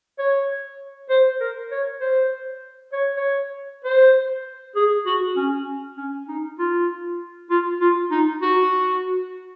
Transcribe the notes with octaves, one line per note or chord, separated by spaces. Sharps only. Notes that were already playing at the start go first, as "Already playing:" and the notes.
C#5
C5
A#4
C#5
C5
C#5
C#5
C5
G#4
F#4
C#4
C#4
D#4
F4
F4
F4
D#4
F#4